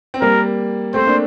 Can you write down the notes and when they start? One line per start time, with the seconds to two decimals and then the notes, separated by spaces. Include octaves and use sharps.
0.14 C4
0.21 G3 A#3 A#4
0.94 A3 C4 C5
1.07 A#3 D4